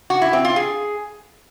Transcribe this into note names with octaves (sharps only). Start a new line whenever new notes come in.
F#4
E4
C4
F4
G#4